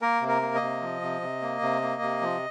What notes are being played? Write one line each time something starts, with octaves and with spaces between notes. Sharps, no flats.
A#3 A#4
C3
A#4
A#3
D#5
C3
F3
C3
C3
A#3
C3
A#3
C3
F3